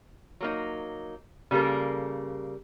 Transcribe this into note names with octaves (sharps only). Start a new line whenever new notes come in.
F#3 A#3 D#4
C#3 G3 A#3 A4 A#4